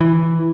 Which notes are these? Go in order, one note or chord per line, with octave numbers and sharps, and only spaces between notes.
E3